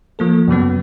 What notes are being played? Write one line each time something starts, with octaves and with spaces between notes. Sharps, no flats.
F3 A#3 A4
F#2 C#3 F#3 B3